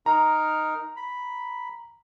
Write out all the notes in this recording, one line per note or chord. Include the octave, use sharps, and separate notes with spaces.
D#4 A#4 A#5
B5